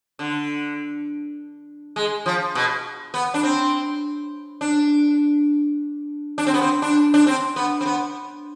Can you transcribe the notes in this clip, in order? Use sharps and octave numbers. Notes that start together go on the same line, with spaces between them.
D3
G#3
F3
B2
B3
D4
C4
D4
D4
C4
B3
C4
D4
D4
C4
B3
C4
B3